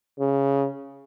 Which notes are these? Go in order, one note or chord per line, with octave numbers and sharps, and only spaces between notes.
C#3